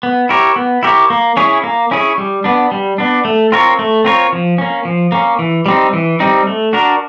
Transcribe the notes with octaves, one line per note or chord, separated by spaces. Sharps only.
B3
E4 G4 A#4 C#5
B3
E4 G4 A#4 C#5
A#3
C#4 E4 G#4 C#5
A#3
C#4 E4 G#4 C#5
G3
B3 D4
G3
B3 D4
A3
C4 F4 A#4 C#5
A3
C4 F4 A#4 C#5
F3
A#3 C#4
F3
A#3 C#4
E3
G3 C4 D#4
E3
G3 C4 D#4
A3
D4 F#4 A#4